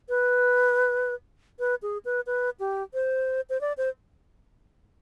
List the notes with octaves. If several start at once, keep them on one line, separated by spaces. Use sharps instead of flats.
B4
B4
G#4
B4
B4
G4
C5
C5
D5
C5